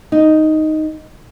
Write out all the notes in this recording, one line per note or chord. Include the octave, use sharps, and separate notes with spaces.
D#4